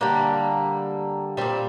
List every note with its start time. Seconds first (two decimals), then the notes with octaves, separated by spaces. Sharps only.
0.01 D3 G3 A#3
1.37 A#2 G3 C4